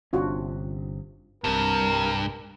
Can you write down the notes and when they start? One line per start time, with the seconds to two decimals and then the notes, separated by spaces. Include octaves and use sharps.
0.13 G1 C3 C#4 D4 F4 F#4
1.44 C2 G2 C3 A#4